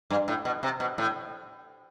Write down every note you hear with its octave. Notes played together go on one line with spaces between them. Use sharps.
G2
A2
B2
C3
B2
A2